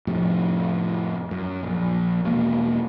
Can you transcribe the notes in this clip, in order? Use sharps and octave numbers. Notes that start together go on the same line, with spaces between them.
F2 A2 C3
F#2
A#1
E1 A#3